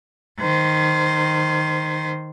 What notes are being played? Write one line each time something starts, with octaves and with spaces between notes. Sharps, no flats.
D#3 C5